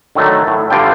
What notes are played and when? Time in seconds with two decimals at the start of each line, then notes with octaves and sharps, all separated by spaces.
0.15 D3 D#3 F#3 A3
0.47 A2
0.70 G2 D3 F4 G5